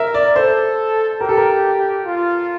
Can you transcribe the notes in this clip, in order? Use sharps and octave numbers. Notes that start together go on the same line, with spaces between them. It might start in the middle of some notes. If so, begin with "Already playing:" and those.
Already playing: A#4 E5
D5
A4 C5
G4 A#4
A4
A#4
F4